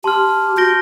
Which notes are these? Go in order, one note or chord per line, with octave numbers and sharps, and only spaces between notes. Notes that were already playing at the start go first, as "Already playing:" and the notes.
G4 A5 C6 F6
F#4 G6 A#6 D7 G7